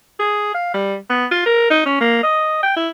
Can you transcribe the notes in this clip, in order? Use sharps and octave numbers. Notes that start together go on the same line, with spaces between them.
G#4
F5
G3
B3
F4
A#4
D#4
C#4
A#3
D#5
G5
E4